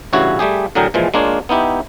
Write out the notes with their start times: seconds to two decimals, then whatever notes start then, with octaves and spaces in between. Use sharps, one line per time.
0.13 A1 G2 C#3 E4 F#4 C#5
0.39 G3 A3 G4 G#4
0.75 A2 D3 F#3 G#4 A#4 G5
0.94 A#2 E3 F3 G#3
1.14 G#3 A#3 D4 F4 C#5
1.49 B3 D#4 E4 G4